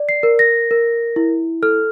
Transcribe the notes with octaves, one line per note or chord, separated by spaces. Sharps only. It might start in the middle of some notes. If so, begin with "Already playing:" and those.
Already playing: D5
C7
A#4
A#6
A#4
E4
A4 F6